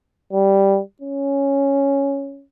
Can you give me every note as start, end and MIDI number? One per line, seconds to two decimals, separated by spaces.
0.33 0.80 55
1.02 2.44 61